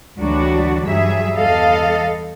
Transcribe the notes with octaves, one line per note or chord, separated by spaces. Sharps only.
D2 E3 F#3 G3 D4 F#4
G2 F#3 G3 G#4 E5
E2 G3 A4 D#5 F5